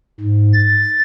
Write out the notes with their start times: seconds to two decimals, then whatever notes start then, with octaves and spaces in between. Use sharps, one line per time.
0.20 G#2
0.54 A6